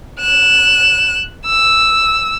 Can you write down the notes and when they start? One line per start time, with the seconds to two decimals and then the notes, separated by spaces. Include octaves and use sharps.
0.19 F#6 E7
1.46 E6